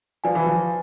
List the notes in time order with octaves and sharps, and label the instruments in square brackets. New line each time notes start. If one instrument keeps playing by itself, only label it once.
[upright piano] F3 [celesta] B4 D5 G#5
[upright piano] E3
F3